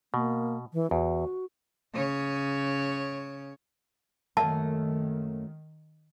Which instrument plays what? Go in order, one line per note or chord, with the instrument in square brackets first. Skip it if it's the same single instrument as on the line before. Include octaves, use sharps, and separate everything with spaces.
[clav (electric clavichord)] B2 [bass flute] A#3
[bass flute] E3
[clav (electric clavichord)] E2 [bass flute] F#4
[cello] C#3 C#5
[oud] F#2 A3 A#3 [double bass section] D#3 [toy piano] A5